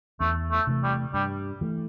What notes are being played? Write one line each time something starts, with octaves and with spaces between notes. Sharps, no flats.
E2 A3
A3
C3 E3 A3
G3
G2 G3
E3 A3